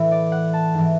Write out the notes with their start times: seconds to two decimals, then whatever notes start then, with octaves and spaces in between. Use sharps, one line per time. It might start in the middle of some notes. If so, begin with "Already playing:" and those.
Already playing: A2 E3
0.12 D5
0.32 F#5
0.53 A5
0.74 G#2 E3